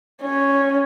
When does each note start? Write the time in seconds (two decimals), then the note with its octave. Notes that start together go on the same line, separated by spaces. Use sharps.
0.22 C#4